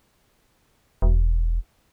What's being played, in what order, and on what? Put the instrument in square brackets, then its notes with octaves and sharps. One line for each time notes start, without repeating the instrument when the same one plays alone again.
[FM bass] E1